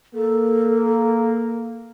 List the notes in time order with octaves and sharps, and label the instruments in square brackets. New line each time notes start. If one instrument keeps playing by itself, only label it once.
[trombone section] A#3 [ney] A4